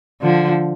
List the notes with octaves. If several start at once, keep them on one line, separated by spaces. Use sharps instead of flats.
D3 F3